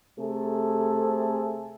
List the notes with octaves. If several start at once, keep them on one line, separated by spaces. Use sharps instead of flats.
C3 A3 G#4 A4